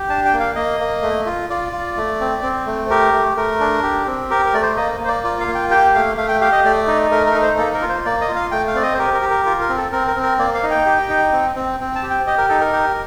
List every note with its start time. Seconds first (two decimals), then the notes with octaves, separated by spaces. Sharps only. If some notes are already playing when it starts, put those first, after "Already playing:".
Already playing: G4
0.09 D4 A5
0.25 G5
0.33 A#3
0.40 F5
0.56 A#3 D#5
0.80 A#3
1.02 A3
1.26 F4
1.50 F4 D5
1.72 F4
1.97 A3
2.20 C4
2.43 C4
2.66 A3
2.90 G4 A#4
3.13 A3
3.36 A3 A#4
3.60 D4
3.83 G4
4.07 C4
4.30 G4 A#4
4.46 A#4
4.54 A3 D5
4.62 C5
4.77 A#3 D#5
5.00 A#3 C5
5.08 D5
5.24 F4 D5
5.40 F5
5.48 A#3
5.55 G5
5.71 G4 G5
5.95 A3 F5
6.17 A3 F5
6.29 G5
6.41 G4 F5
6.53 D#5
6.65 A3 D5
6.87 D#4
7.11 A3 A#4
7.26 A#4
7.35 D#4
7.42 C5
7.58 A#3 A4
7.74 A#4
7.82 F4
7.89 C5
8.05 A#3 D5
8.21 D#5
8.29 F4
8.36 F5
8.51 A3 G5
8.68 F5
8.75 C4 D5
8.83 D#5
8.94 C5
8.99 G4 A#4
9.14 A#4
9.22 G4
9.30 A#4
9.46 F4 A#4
9.61 A#4
9.69 C4
9.77 A4
9.92 C4 A#4
10.08 A#4
10.16 C4
10.23 A#4
10.38 A#3 D5
10.55 F5
10.63 D#4
10.71 G5
10.86 G4
11.10 D#4
11.33 C4
11.56 C4
11.80 C4
11.95 A5
12.03 G4
12.10 G5
12.27 G4 D#5
12.38 A#4
12.49 D#4 A4
12.61 A#4
12.73 G4